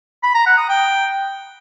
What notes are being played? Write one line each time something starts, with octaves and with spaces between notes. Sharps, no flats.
B5
A#5
F#5
D#6
G5